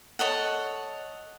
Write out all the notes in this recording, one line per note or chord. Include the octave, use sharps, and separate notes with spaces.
A4 C#5 D#5 F#5